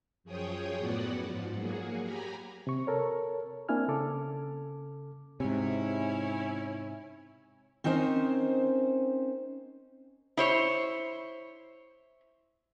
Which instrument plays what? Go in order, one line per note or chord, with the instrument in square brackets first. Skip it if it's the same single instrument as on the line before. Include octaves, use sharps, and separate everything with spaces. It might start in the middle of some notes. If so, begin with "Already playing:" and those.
[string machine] F#2 F3 G#4 C#5 G5 D#6
F#2 A2 B3 F#4 D5 F#5
G#2 F3
F#3 A#3 F#4 G#4
G4 G#5 A#5 B5
[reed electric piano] C3 C#6
A4 A#4 C#5
A#3 C4 D4 E4 G#5 F6
C#3 A4 D6
[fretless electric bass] G#2 C3 [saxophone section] C#4 E4
[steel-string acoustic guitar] C4 C#4 D#4 A#4 C5
[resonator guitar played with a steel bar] E4 C5 C#5